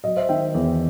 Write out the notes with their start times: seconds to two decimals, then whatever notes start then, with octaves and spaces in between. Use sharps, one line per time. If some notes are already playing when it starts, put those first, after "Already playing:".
0.04 F#3 D#5
0.17 C5 E5
0.29 D#3 E5 G5
0.54 E2